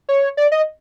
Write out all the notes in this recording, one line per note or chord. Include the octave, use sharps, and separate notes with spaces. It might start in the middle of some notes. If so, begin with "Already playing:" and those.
C#5
D5
D#5